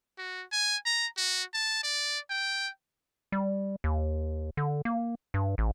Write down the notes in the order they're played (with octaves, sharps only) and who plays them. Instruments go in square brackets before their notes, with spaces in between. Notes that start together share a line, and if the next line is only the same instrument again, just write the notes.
[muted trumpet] F#4
G#5
A#5
F#4
A5
D5
G5
[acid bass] G3
D#2
D3
A#3
G2
A1